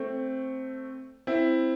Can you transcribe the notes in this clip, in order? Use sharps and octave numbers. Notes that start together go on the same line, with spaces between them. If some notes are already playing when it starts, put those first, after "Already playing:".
Already playing: A3 C4
C4 E4